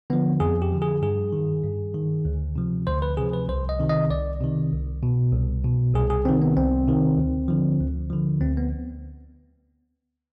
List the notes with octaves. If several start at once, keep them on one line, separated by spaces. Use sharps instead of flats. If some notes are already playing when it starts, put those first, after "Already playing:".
D3 F3 B3
F2 G#4
G4
D3 F3
G#4
G2 G#4
D#3
G2
D#3
D2
C3 F3
D2 C5
B4
C3 F3 G#4
B4
C2 C5
D#5
C3 D#3
D#5
C2 D5
C3 D#3
C2
B2
C2
B2
C2 G#4
G#4
C3 D#3 C4
B3
C2 C4
C3 D#3
D2
D3 F3
D2
D3 F3
D2 C4
B3